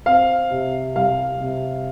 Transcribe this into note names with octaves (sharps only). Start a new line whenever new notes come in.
C4 F5
C3
C2 F5
C3